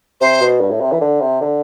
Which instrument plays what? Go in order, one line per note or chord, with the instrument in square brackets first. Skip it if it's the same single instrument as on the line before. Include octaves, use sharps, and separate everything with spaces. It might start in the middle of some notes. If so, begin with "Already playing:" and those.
[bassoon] C3 [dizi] C5
[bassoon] B2
G2
A2
C3
E3
D3
C3
D3